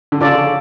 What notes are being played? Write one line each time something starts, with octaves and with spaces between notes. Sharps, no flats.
D3
C#3 F4 A4 D5